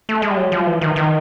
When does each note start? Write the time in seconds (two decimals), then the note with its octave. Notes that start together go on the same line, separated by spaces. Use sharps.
0.09 A3
0.22 G#3
0.31 G3
0.37 F#3
0.52 F3
0.66 E3
0.81 D#3
0.96 D#3